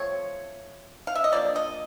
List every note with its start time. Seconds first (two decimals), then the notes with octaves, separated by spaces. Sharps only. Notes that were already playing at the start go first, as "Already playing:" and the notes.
Already playing: F3 A3 C4 C#5
1.07 F5
1.15 E5
1.24 D#5
1.32 F3 A#3 D4 D5
1.56 D#5